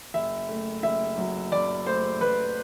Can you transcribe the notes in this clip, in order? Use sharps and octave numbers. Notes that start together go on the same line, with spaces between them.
F#1 E5
A3
F#1 E5
F#3
F#1 D5
A3 C5
F#1 B4